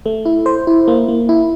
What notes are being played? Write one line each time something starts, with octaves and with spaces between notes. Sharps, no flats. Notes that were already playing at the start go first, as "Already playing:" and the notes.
A3
E4
C5
E4
A#3
A#3
E4